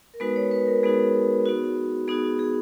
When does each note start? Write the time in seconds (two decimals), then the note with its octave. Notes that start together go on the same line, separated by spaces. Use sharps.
0.14 A#4
0.20 G#3 B3 D#4 F#4 B4
0.36 C#5
0.51 B4
0.67 A#4
0.83 G#3 B3 D#4 F#4 G#4
1.46 B3 D#4 F#4
2.08 B3 D#4 F#4 G#4
2.24 F#4
2.39 G#4